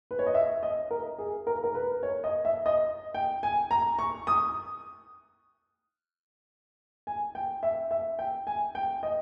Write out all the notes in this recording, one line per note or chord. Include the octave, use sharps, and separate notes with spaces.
B4
C#5
D#5
E5
D#5
A#4
G#4
A#4
A#4
B4
C#5
D#5
E5
D#5
G5
G#5
A#5
C#6
D#6
G#5
G5
E5
E5
G5
G#5
G5
D#5